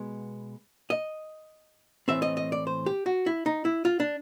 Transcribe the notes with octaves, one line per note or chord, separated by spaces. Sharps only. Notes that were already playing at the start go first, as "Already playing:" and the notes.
Already playing: B2 G#3 B3
D#5
A2 E3 A3 C4 E5
D#5
D#5
D5
C5
G4
F#4
E4
D#4
E4
F4
D4